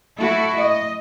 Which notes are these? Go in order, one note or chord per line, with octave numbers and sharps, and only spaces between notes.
A3 E4 F#4 A4
D#5